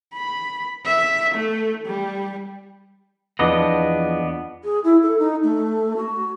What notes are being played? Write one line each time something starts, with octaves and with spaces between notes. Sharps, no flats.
B5
E5
A3
G3
E2 F3 B3 D4 D#5
G#4
E4
A4
D#4
A3
F#4